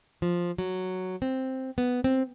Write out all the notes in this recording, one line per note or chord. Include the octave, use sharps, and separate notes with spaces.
F3
F#3
C4
B3
C4